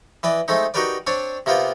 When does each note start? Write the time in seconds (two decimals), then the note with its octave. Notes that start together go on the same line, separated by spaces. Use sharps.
0.23 E3 B4 D5 D#5
0.48 G#3 A3 C4 D#4
0.74 D#4 F#4 G4 A#4 B4 D5
1.07 C4 D4 C#5 D5
1.46 C3 A#3 B3 F4 G4